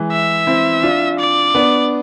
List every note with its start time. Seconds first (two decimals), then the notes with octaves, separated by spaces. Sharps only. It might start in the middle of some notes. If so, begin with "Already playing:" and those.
Already playing: E3 G#3
0.12 E5
0.47 C4 E4
0.83 D4 F4
1.19 D5
1.55 B3 D4